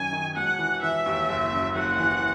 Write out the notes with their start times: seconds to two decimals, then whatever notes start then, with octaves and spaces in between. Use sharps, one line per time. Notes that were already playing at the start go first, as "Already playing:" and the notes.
Already playing: F#2 D#3 F#3 G#5
0.13 D#3
0.36 E1 F#5
0.59 E3
0.82 E3 E5
1.06 D#2
1.29 F#1
1.53 F#2
1.75 F#1 F#5
1.99 E3